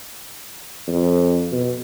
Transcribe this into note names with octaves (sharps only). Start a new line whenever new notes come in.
F2
B2